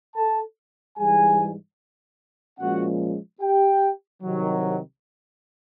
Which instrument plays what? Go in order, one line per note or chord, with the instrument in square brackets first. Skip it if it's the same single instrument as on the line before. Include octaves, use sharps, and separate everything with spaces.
[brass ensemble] A4 A5
G#2 E3 G3 G#4 G#5
A#2 F3 G#3 C#4 F#4 F#5
G4 G5
C2 C3 D#3 F#3